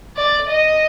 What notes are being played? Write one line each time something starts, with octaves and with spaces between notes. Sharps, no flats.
D5
D#5